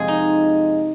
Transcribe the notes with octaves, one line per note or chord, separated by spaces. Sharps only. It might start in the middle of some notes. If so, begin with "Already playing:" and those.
Already playing: F2 C3 F3 G#3 G#4
D#4